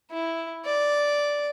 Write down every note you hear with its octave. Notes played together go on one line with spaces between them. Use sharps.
E4
D5